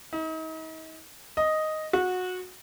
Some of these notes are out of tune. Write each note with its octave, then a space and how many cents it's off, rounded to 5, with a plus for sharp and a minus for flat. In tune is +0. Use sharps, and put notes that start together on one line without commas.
D#4 +40
D#5 +0
F#4 -20